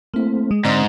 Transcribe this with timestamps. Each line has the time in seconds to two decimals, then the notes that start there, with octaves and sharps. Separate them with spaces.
0.14 A3 A#3 C4 E4
0.51 G#3
0.65 G#2 D3 C4 D5 A#5